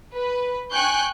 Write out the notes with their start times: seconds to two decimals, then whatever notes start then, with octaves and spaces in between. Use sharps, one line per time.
0.14 B4
0.72 G5 G#5 C#6 F#6 G6